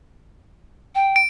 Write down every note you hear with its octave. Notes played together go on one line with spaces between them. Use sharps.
G5
D7